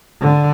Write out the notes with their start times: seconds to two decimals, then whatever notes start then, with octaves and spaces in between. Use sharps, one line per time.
0.20 D3